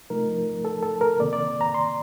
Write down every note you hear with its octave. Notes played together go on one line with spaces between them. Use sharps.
C3 F3 A3 D#4 A#4
A4
A4
A#4
D2 C3 D#3 A#3 D5
D5
A#5
C6